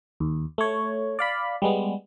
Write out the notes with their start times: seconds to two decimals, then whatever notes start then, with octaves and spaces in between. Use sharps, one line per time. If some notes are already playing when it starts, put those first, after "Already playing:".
0.20 D#2
0.58 A3 C#5
1.19 D5 F5 B5
1.62 G3 G#3 B3